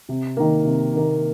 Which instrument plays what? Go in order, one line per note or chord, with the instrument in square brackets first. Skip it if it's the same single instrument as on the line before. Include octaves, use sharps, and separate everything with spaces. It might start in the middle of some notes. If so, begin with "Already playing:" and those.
[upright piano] C3
D#3 A#3
C3
D#3 A#3